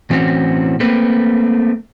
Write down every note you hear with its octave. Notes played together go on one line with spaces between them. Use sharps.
A2 E3 C4 C#4 E4 F#4
A3 A#3 C4 B4